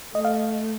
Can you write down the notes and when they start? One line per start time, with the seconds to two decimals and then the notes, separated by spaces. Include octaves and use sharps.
0.15 A3 D#5
0.25 F5